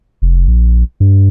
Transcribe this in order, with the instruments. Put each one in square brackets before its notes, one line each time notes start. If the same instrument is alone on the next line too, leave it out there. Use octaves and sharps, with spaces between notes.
[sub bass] F1
A#1
G2